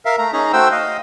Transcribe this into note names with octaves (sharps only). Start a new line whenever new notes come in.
A#4 E5 F5
A3 A#5
C#4 D#4 G#4 A#5
A3 F#4 C5 G5 E6
D#5 F5